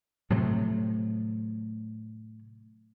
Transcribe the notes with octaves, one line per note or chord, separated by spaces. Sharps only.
A2 C3 F3 F#3